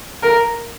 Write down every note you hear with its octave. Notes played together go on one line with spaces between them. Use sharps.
A#4